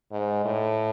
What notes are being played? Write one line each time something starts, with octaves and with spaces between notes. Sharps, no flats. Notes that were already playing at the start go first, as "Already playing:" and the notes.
G#2
A2